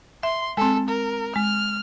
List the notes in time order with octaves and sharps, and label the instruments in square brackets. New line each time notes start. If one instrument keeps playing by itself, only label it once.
[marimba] E5 [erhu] C6
[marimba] G#3 C4 [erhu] A4
[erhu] A#4
[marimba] G#3 [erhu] F6